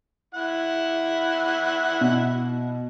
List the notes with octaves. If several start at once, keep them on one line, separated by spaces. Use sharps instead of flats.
E4 F#5
B2